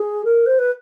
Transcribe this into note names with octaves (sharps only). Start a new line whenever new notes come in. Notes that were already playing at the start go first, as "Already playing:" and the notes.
Already playing: G#4
A#4
C5
B4